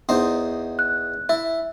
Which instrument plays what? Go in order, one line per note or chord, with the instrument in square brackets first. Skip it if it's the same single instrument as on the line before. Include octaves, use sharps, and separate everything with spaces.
[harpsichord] E2 D#4 C5
[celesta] F#6
[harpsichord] E4 [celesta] E5